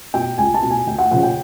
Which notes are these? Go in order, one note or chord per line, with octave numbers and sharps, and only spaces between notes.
B2 G5
C#2 G#5
A5
B2
G#5
D2 G5
F#5
C#3 F3 F#5
G5